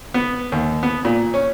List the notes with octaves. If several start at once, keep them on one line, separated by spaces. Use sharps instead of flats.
B3
D#2
B3
A#2
C#4